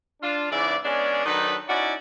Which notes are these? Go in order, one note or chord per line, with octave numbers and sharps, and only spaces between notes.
D4 F4
G#2 C#3 E3 E4 D5
G#3 B3 C#4 D4 G#4 D5
D#3 F#3 D4 D#4 A4 B4
C#4 D#4 E4 F#4 D5